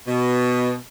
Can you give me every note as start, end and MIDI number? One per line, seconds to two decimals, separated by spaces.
0.06 0.73 47